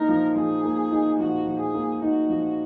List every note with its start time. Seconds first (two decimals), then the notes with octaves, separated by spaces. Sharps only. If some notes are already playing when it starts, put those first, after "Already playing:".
Already playing: A#3 D#4 A#4
0.08 F3
0.35 F3 G#4
0.63 A#3
0.91 D#4
1.19 F3 F#4
1.46 F3
1.60 G#4
1.74 A#3
2.01 D#4 F#4
2.29 F3